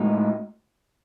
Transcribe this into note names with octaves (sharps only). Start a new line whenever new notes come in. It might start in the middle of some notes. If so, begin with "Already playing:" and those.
Already playing: A2 G#3 D#4 F#4